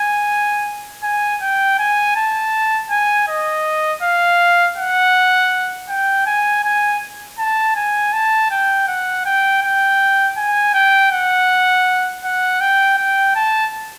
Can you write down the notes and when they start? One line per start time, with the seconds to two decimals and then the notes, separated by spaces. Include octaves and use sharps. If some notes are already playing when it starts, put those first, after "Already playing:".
Already playing: G#5
1.03 G#5
1.42 G5
1.79 G#5
2.16 A5
2.91 G#5
3.28 D#5
4.03 F5
4.77 F#5
5.89 G5
6.27 G#5
6.64 G#5
7.39 A5
7.76 G#5
8.13 A5
8.50 G5
8.88 F#5
9.26 G5
9.62 G5
10.37 G#5
10.74 G5
11.12 F#5
12.24 F#5
12.61 G5
12.98 G5
13.35 A5